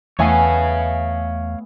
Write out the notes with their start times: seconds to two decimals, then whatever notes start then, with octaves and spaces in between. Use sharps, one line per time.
0.19 E2 A3 B3 C#5 F5 G#5